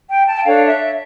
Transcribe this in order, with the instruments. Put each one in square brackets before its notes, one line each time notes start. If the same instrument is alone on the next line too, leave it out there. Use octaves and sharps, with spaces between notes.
[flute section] G5
A5
G5
D4 A4 C#5 F5
E5